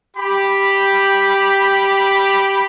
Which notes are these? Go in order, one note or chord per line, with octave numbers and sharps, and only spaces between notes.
G4 B5